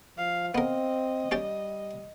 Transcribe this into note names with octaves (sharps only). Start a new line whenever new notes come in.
F3 F5
B3 C4 A#4 D#5
G3 C#4 G4 D5